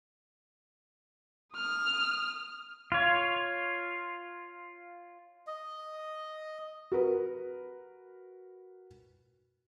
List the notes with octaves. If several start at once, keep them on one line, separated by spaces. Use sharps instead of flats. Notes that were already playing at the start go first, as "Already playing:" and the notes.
D#6 F6
F4 C#5
D#5
F#4 A#4 B4